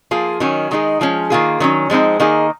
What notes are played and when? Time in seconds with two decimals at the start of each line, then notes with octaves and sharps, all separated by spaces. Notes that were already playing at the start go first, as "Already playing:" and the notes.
0.11 F3 A#3 F4 G#4
0.40 D#3 F#3 C#4
0.71 D#3 G#3 D#4 G#4
1.01 F3 G#3 C#4
1.30 D#3 A#3 F4 G#4
1.60 D#3 F#3 C#4
1.90 F3 G#3 C4 D#4
2.20 D#3 A#3 D#4 G#4